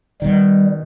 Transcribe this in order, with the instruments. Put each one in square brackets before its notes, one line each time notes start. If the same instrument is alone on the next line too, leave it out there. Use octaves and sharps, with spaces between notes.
[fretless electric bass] B2 D#3 [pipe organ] G3